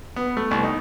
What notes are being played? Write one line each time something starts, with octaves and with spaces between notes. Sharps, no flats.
B3
A3
C2
D#4